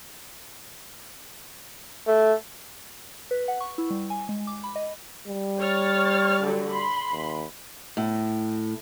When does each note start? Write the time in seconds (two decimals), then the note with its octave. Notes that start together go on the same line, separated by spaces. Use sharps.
2.07 A3
3.31 B4
3.48 F#5
3.61 C#6
3.78 E4
3.91 G3
4.10 G#5
4.29 G#3
4.47 D6
4.64 B5
4.76 D#5
5.28 G3
5.59 C#5 F6 A6
6.44 D3 F#3
6.73 B5 C6
7.12 D#2
7.97 A2